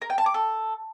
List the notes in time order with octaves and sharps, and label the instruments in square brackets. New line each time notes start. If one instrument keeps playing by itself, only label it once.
[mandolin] A#4
G5
A5
D6
A4